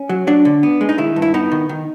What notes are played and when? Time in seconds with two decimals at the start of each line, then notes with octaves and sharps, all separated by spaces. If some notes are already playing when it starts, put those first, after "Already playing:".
Already playing: C#4
0.09 F#3
0.27 F#3 D4
0.45 D3
0.63 B3
0.81 G#3
0.89 D#4
0.98 D#3 E4
1.16 G2
1.22 E4
1.34 B3 D#4
1.52 D#3
1.69 D#3